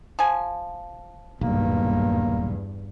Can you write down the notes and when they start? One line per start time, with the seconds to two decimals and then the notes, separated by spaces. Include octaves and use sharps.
0.19 F3 G#5
1.41 D#1 B1 E2 G2 A#3